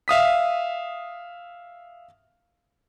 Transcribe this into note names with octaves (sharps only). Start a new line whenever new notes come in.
E5 F5 D#6 B6